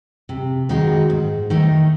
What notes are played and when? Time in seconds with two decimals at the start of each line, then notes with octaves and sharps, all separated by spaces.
0.29 C3
0.69 D#3 G#3 D#4 F#4
1.10 G#2
1.50 D#3 A3 D#4